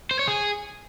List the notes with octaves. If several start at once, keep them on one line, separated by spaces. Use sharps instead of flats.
C5
C#5
G#4